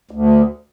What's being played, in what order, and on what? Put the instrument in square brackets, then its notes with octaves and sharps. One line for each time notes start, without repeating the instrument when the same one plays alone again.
[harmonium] D2